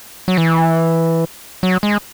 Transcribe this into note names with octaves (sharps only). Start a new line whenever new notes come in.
F#3
E3
F#3
G#3